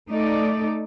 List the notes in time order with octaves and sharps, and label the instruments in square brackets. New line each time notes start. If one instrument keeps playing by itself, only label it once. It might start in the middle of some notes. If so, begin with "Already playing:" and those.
[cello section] A3 D#4 A4 D5